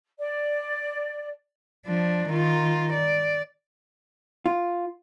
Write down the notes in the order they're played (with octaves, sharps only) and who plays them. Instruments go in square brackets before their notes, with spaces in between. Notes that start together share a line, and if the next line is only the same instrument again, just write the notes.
[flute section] D5
[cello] F3 D4
D#3 F4
D5
[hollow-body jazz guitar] F4